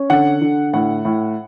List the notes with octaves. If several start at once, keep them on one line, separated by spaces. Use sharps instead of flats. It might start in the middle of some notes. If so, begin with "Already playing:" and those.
Already playing: C#4
D3 F#5
D3
A2 F#5
A2